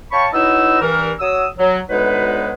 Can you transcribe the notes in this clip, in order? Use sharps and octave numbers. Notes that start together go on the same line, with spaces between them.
C#5 F5 G5 A5 B5 C#6
F#3 B3 D#4 E4 D#5 E6
G2 E3 A#4
F#3 D#6 E6
F#3
D2 F#3 G#3 B3 D#4 B4